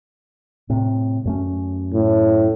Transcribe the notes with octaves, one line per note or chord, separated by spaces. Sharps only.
A2 C3
F#2 A3 C#4
A2